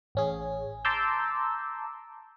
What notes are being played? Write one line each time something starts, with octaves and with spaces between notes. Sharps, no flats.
A1 C#4 G#4
A5 A#5 C6 D6 E6 G6